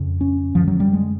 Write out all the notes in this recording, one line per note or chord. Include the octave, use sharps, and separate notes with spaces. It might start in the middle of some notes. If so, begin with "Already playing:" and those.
Already playing: F2 C#3
C#4
F#2 D3 F3
F#3
G3
G#3